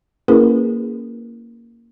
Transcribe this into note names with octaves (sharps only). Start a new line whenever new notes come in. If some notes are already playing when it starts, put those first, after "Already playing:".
A#3 C#4 E4 G#4 A#4 B4